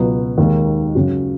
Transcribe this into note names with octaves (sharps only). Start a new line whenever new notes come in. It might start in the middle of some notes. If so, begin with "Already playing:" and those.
Already playing: C#2 B2 F#3 B3
D#2 D#3 G#3
C#3 F#3 C#4 F#4